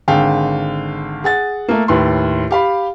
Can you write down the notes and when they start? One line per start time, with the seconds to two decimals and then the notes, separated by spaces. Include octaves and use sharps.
0.08 G#1 D3 G#4 F5 G5
1.24 G#4 F#5 A6
1.68 A3 A#3
1.88 D#2 A2 B4 C6
2.51 G4 F5 B5